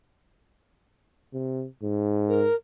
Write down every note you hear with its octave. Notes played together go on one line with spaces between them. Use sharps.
C3
G#2
A#4